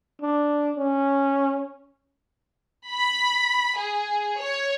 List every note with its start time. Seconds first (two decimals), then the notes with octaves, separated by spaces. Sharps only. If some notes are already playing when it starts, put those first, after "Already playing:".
0.22 D4
0.76 C#4
2.89 B5
3.78 G#4
4.39 C#5